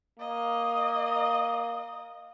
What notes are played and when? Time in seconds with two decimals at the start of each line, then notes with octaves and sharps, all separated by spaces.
0.19 A#3 D#5